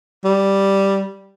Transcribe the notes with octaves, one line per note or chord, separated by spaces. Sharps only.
G3